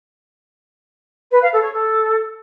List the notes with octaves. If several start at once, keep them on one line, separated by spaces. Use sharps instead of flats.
B4
F5
A4
C#5
A4